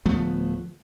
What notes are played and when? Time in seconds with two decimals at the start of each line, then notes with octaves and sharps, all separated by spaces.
0.06 D1 F3 A3 B3